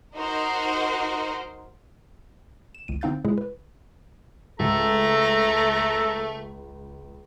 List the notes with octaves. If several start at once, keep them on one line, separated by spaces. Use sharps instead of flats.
D#4 F#4 A#4 C5
E7
G1 C#2 D#7
D3 C4 D#4 F5 G6 A6
A#2 C#3 G#3 E4 G#4
B4
C#2 A3 A4 A#5